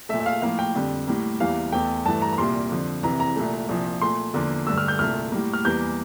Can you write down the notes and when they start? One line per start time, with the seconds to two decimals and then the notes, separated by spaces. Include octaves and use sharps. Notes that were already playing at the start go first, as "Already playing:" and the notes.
0.09 A3 E5
0.14 A#2
0.20 E5
0.26 F5
0.42 A2 F3 A#3 F5
0.59 G5
0.75 F2 D3 G3
1.07 A2 G3 A#3
1.40 E2 E3 G3 A#3 F5
1.72 E2 E3 A3 G5
2.05 G2 E3 A3 A5
2.22 A#5
2.32 A#5
2.38 C2 A#2 G3 A#3 C6
2.71 F2 D3 F3
3.03 C2 C3 E3 A#5
3.20 A#5
3.36 C2 A#2 A3
3.69 C2 A#2 F3
4.01 A#2 A3 C6
4.34 E2 D3 F3 A#3
4.67 G2 D3 A3 E6
4.78 F6
4.88 G6
4.99 C2 A#2 A3 F6
5.32 A2 G3 A#3
5.53 F6
5.65 E2 E3 G3 A#3 G6